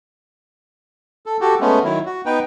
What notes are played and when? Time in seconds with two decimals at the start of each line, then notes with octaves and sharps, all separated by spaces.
1.26 A4
1.41 F#4 G4 A4
1.61 G#3 A3 B3 C#4
1.84 D#3 F#3 E4
2.06 F#4
2.26 B3 D#4 B4 G5